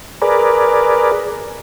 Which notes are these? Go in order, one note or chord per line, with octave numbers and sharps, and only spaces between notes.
G#4 A#4 B4 D5